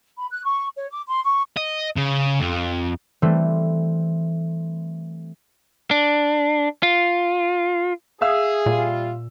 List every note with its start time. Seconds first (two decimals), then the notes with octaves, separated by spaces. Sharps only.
0.18 B5
0.31 F#6
0.45 C#6
0.76 C#5
0.91 D6
1.07 C6
1.24 C#6
1.57 D#5
1.96 C#3
2.40 F2
3.22 E3 G3 A3 C4
5.91 D4
6.83 F4
8.21 G#4 E5 F5 E6
8.66 A#2 G3 F4